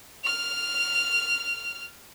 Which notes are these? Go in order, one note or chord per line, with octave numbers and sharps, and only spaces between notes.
F6 F7